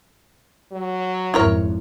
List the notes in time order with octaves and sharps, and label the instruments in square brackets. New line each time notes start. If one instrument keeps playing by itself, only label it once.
[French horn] F#3
[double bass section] G#1 F2 [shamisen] E4 A#4 C#5